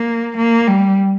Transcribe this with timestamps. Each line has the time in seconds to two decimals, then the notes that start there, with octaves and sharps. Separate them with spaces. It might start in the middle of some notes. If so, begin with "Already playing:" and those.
Already playing: A#3
0.37 A#3
0.68 G3